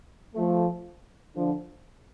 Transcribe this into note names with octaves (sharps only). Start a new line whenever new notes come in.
F3 A3
D3 F3